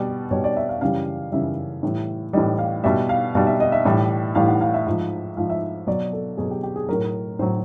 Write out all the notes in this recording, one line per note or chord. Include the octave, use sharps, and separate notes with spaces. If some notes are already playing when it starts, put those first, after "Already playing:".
Already playing: B2 G3 D5
B2 G3 C#5
D5
E5
F5
F#2 C#3 E3 G3 F5
F#2 C#3 E3 G3 E5
A2 E3 G3
A2 E3 G3 D#5
F5
B2 G3 E5
F5
B2 G3 F5
E5
D#5
E5
A2 E3 G3
A2 E3 G3 F5
F#5
F5
E5
G#2 F3
G#2 F3 F5
E5
B2 F#3 D5
A4
B2 F#3 G#4
G4
G4
G#4
A2 F#3 A#4
A2 F#3 C5